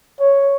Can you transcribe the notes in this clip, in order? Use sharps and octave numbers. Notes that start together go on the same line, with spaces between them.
C#5